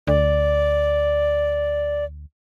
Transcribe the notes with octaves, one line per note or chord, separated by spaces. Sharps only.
D2 D5